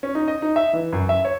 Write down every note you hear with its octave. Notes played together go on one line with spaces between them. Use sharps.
C#4
D#4
D#5
D#4
E5
E3
F#2
E5
C#5